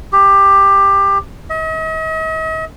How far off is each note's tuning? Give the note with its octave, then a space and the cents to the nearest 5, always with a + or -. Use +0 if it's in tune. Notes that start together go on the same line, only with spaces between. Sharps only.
G4 +15
D#5 +45